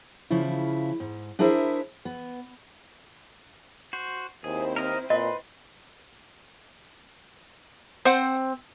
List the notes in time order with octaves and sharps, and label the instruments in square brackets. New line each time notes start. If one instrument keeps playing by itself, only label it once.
[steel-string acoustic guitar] C#3 F3 E4
G#2
D4 E4 G#4 A#4 C5 E5
B3
[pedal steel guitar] F#4 C5
[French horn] D#2 [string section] C4 E4 C5 [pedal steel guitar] G#4
[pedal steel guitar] A#4 D#5 F6
[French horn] A#2 [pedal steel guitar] B4 B5 C6 [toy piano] D#5
[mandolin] C4 [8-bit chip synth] C5 F#5